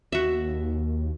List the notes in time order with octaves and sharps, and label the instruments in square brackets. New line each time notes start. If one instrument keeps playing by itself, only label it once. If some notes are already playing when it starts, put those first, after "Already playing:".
[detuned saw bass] D#2 [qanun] F#4 E5